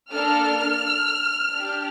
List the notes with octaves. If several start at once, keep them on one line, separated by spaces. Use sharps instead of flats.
A#3 D4 A4 F6
D4 G4